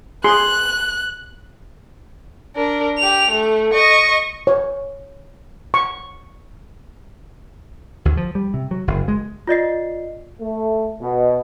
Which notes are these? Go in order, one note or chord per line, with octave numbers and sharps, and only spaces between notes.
G#4 C6 F#6
D4 A#4
G4 F7
A3
D#5 C#6
C#5
C#6
D2
F3
G3
C3
F#3
F#1
G#3
F4 D5 D#5 C7
A3
B2